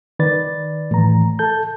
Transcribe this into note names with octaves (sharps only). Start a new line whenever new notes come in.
D#3 B4 D5 A6
A2 E3 A#5
A4 A5 G6